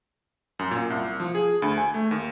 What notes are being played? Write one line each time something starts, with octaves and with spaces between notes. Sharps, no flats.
F#2
A#2
C2
F3
G#4
D2
G#5
A3
D#2